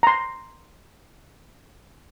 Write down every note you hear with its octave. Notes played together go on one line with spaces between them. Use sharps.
A#5 C6